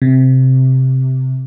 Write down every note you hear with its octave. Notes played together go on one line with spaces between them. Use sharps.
C3